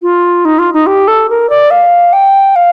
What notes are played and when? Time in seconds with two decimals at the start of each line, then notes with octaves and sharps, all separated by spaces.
0.02 F4
0.45 D#4
0.59 F4
0.73 D#4
0.87 G4
1.08 A4
1.30 A#4
1.50 D5
1.71 F5
2.13 G5
2.56 F5